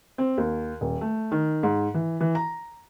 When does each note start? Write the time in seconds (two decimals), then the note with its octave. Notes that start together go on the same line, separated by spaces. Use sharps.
0.18 C4
0.38 D#2
0.81 D#1
1.01 A3
1.32 D#3
1.63 G#2
1.94 E3
2.20 E3
2.35 A#5